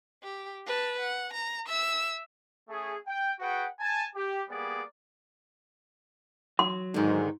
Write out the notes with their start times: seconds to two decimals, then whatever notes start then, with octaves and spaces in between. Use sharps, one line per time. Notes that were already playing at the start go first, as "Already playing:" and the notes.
0.23 G4
0.66 B4 A5
1.00 F#5
1.33 A#5
1.67 E5 E6
2.69 A3 C#4 G#4
3.07 G5
3.39 F#4 G#4 B4 F#5 G5
3.80 G#5 A5
4.15 G4
4.49 G3 A#3 B3 G#4 D5
6.59 F#3 C6
6.94 G#2 D3 D#3